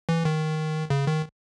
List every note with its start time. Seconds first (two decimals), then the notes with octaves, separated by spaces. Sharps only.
0.09 E3
0.25 D#3
0.90 C#3
1.07 D#3